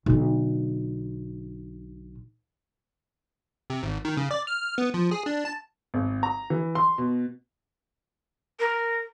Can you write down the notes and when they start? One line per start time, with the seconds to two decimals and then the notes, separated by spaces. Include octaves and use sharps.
0.06 B1 D3
3.70 C3
3.83 G#1
4.05 D#3
4.17 C#3
4.31 D5
4.47 F6
4.78 B3
4.94 F3
5.11 G#4
5.26 D4
5.45 A5
5.94 G#1
6.23 A#5
6.50 E3
6.75 C6
6.98 B2
8.60 A#4